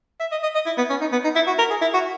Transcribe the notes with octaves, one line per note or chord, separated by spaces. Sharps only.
E5
D#5
D#5
D#5
E4
B3
C#4
D#4
B3
D#4
E4
F#4
A#4
G#4
E4
F#4